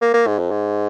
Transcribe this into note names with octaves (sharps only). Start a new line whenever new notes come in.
A#3
A#3
G#2
F2
G#2